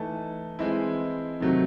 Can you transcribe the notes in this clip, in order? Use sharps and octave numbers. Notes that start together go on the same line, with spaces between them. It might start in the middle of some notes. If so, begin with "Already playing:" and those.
Already playing: E3 A3 D#4 A5
E3 G#3 C4 E4
C3 D#3 F#3 A3 C4